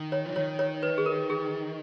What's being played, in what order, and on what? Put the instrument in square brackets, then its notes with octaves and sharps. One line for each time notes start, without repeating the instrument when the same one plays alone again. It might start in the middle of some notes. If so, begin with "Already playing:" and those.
Already playing: [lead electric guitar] D#3
[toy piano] C#5
[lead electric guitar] F3
[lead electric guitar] D#3 [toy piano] C#5
[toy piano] C#5
B4
G#4
A#4
G#4